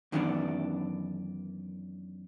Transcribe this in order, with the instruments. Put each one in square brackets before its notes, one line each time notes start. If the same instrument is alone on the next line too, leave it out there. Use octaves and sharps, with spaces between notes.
[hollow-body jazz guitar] F#2 D#3 E3 B3 C#4 D4